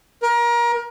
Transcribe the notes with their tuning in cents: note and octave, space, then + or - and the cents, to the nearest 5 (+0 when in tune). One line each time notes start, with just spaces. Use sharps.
A#4 +30